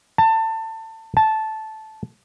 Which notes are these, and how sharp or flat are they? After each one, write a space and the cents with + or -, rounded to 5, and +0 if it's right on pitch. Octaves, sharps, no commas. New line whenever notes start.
A5 +25
A5 -10